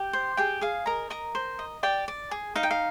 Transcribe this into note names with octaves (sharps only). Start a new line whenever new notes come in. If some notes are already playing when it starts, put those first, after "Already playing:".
Already playing: G4 G5
C5
G4 G#4 G5
G#4 F5
A#4 D#5 A#5
A#4 D#5 A#5
C5
D#5
G4 D5 G5
D5
G#4
D#4 F5
G5
F5